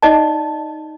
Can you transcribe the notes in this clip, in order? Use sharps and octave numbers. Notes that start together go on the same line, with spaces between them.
D#4 D5 D#5 A5